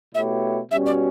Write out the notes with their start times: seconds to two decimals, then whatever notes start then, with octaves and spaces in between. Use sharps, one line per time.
0.15 B2 A3 E4 G4 C#5 E5
0.71 B2 G3 C#4 F#4 E5
0.86 D5